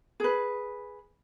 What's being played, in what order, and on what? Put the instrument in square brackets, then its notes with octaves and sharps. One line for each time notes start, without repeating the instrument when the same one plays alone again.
[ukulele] G#4 B4